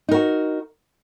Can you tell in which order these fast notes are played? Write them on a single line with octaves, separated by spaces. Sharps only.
D#4 A#4 F#4